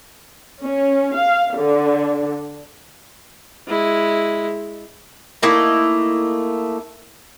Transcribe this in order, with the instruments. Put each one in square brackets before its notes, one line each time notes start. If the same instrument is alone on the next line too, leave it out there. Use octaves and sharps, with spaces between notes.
[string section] C#4
F5
D3
[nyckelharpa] G#3 E4
[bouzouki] A3 A#3 D#4 E4